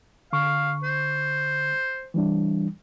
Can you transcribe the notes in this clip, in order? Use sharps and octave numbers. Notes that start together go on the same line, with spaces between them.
D3 F5 C#6
C5
E3 G3 D4